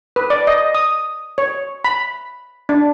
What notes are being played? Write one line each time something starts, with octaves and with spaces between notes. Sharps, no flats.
B4
D5
D#5
D#6
C#5
B5
D4